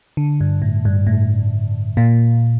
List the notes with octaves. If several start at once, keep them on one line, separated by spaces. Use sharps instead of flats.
D3
G2
A2
G2
A2
A#2